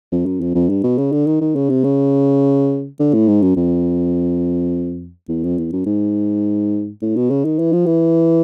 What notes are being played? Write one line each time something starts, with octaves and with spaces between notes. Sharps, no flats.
F2
F#2
F2
F2
G2
B2
C#3
D3
D#3
D#3
C#3
C3
C#3
D3
A2
G#2
F#2
F2
E2
F2
E2
F#2
G#2
A2
B2
C#3
D#3
E3
F3
E3